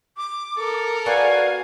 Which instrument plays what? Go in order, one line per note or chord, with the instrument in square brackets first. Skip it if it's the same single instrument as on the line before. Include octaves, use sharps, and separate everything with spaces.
[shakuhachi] D6
[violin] A4 A#4
[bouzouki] B3 F#4 D5 [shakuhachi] F5 [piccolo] G#5